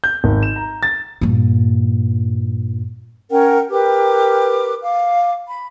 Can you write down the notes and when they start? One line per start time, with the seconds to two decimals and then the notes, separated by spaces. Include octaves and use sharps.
0.04 G6
0.24 G#1
0.43 E7
0.56 A#5
0.83 A6
1.21 G2 A#2
3.31 C#4 A#4 F#5 G5
3.70 G4 A#4 B4 D6
4.81 F5 D6
5.46 B5